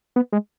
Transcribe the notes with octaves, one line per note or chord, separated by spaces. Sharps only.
B3
G#3